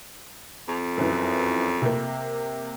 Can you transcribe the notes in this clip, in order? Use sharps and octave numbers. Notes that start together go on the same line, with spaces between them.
F2
F#2 E3
C3 A#3